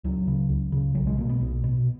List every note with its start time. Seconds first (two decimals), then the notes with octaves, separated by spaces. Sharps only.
0.04 C#2 F#3
0.27 C#3
0.50 C#2
0.72 C#3
0.95 B1 F#3
1.07 G#3
1.18 B2 A#3
1.29 B3
1.40 B1
1.64 B2